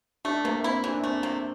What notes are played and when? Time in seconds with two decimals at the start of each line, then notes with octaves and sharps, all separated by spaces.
0.25 A3 D4
0.44 C3 A#3
0.64 C4 E4
0.84 E3 D4
1.04 A3 C4
1.22 C3 C4